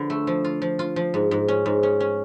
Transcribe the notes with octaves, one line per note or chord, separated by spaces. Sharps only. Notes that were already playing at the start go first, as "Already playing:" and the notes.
Already playing: D3 F3 B3
A3
F3
F4
F3
F4
F3
G#2
G#2
C#4
G#2
C#4
C#4